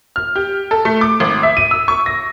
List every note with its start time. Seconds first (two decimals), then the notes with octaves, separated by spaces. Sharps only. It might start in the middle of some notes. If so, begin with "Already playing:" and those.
0.16 F6
0.36 G4
0.71 A4
0.85 A3
1.01 D6
1.20 G#1
1.43 E5
1.57 D#7
1.71 E6
1.88 C#6
2.06 A#6